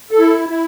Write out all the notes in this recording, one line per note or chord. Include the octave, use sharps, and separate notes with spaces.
A4
E4
E4